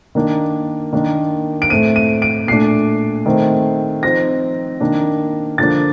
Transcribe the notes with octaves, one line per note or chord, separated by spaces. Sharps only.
D#3 A#3 D4
D#3 A#3 D4
D7
A2 A3 C4 D#7
D#7
D7
A#2 A3 D4 C7
D#3 A3 C4
F3 C4 D#4 A#6
D#3 A#3 D4
D3 F3 A#3 D4 A6